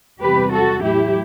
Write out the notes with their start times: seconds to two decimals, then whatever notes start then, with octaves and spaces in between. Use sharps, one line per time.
0.21 E2 C3 G3 G4 B4
0.53 F#4 A4
0.84 A2 F#3 E4 G4